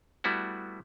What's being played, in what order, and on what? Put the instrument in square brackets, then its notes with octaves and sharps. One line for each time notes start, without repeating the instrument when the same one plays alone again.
[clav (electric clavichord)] G3 A3 B3 E4 F#4